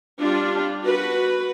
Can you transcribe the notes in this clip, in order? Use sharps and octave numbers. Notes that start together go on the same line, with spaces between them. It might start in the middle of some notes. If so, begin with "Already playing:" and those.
G3 D4 F4
F#4 B4